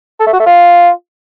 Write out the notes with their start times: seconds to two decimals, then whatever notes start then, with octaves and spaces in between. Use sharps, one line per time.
0.20 A4
0.26 A3
0.33 F#4
0.40 A3
0.46 F4